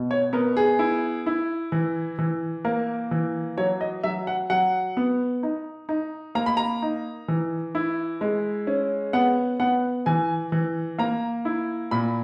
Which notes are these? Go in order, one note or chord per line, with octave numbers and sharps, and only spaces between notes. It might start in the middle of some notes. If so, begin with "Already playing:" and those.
Already playing: B2
C#5
B3 A#4
G#4
E4
E4
E3
E3
A#3 A#4
E3
F#3 C#5
D#5
F#3 E5
F#5
F#3 F#5
B3
D#4
D#4
A#3 A#5
B5
A#5
D#4
E3
E4
G#3
C#4
B3 F#5
B3 F#5
E3 G#5
E3
A#3 A#5
E4
A#2 B5